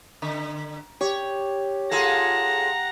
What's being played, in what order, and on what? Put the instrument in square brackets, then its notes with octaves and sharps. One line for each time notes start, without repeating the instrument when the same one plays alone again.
[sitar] D3
[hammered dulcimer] G4 [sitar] C#5
[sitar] F4 G#4 A4 [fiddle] F#5 A#5